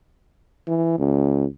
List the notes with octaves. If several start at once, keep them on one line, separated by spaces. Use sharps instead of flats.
E3
C#2